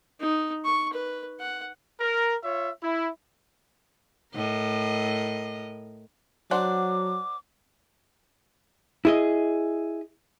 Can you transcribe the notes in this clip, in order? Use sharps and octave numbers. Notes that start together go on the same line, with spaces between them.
D#4
C#6
B4
F#5
A#4
F4 C#5 E5
E4
A2 A#4 D#5
F#3 D4 C5 F#5 D6
E4 G#4 D#5